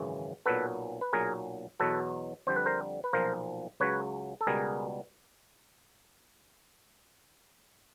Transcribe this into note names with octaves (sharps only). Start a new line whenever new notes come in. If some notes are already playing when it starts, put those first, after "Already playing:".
Already playing: G#1 F#2 C#3 E3
B1 A#2 F#3 B3 A4 B4
B4
B1 A#2 F#3 G#4 A#4
E2 B2 F#3 A4 B4
F2 D3 G3 C5
B4
A#4 C5
B4
B1 A#2 F3 A#4 C5
C#2 C#3 F#3 B4 C#5
A4
C#2 B2 G3 B3 G#4 A#4